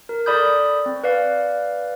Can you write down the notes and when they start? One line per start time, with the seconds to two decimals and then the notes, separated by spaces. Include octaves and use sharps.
0.09 A#4
0.26 A4 D5 B5 D#6 G6
0.86 C4
1.04 B4 D5 F5